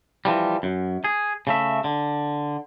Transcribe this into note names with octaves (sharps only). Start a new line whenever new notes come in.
E3 F3 G3
F#2
G#4
C#3 A3 E5
D3